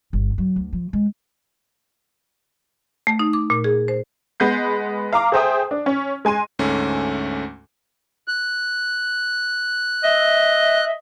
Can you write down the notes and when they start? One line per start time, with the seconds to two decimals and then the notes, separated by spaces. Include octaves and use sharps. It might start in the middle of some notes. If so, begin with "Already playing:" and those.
0.13 G1
0.38 F#3
0.56 D2
0.73 F3
0.93 G#3
3.07 A3
3.19 D#4
3.33 D6
3.50 A#2
3.64 G#4
3.88 C5
4.40 G#3 B3 G6 C7
5.13 F5 A#5 D6
5.32 G#4 A4 C5 E5 G5 D#6
5.71 D4
5.86 C#4
6.25 G#3 G#5 C6 D#7
6.59 D2 G#2 A3 C#4
8.28 F#6
10.04 D#5 E5